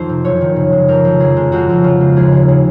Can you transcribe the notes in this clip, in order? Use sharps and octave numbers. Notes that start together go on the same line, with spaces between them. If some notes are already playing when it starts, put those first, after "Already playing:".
Already playing: F2 D#3 C5
C3
F#1 C#5
D#3
C#3
G#3
F2 A#4
F2
C#3 G#4
G#3
F2 F#4
F2
C#3 F4
G#3
D#2 G#4
D#2
C#3